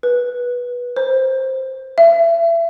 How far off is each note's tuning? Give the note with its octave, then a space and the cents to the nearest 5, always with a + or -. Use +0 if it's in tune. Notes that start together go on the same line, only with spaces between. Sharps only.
B4 -15
C5 +10
E5 +30